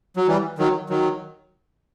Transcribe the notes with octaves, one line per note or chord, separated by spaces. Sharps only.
F#3
E3 G3
D#3 F#3
D#3 F#3